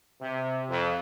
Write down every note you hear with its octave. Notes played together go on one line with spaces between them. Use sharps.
C3
F2